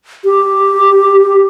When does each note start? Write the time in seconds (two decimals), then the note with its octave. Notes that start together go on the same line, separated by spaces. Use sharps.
0.24 G4